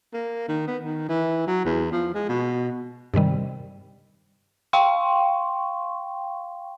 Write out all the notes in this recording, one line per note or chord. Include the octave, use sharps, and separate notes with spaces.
A#3
D#3
B3
D#3
E3
F#3
E2
F3
G#3
B2
G2 C3 D#3 G3
F5 G5 C6 C#6